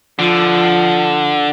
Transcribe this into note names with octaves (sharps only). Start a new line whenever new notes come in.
D3 F3